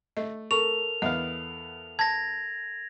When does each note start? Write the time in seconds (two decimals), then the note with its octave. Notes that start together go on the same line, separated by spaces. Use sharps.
0.17 A3 D#5
0.51 A4 A#4 C#6 F7
1.02 E2 B3 D#5 F5
1.99 A5 G#6 A#6